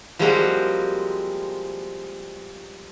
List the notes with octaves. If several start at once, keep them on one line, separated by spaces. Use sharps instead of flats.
F3 G3 G#3 A#3 C4 F#4